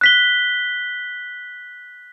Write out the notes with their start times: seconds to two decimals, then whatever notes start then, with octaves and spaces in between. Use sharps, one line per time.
0.01 F#6 B6 G7